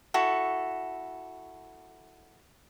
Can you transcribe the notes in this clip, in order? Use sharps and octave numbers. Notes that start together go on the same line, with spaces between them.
E4 F#4 A4